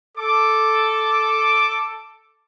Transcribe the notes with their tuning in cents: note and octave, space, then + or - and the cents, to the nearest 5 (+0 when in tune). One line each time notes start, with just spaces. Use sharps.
A4 +0 D6 +0